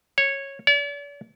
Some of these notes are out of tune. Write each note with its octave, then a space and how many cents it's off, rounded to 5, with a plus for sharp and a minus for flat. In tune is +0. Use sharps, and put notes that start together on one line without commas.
C#5 -10
D5 -45